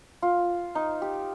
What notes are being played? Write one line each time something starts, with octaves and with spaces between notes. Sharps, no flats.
F4
D#4
G4